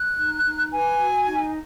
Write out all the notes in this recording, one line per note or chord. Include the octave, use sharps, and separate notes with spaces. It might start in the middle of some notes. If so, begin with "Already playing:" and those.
Already playing: F#6
D#4
D#4
B4 G#5
F#4
D#4